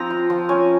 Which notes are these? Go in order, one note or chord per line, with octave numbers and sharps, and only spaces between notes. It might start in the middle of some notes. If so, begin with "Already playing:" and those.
Already playing: F3 C4 A#5
F4
F3
C#4 G#5